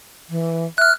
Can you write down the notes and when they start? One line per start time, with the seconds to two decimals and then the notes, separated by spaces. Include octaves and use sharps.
0.30 E3
0.78 E5 F6 F#6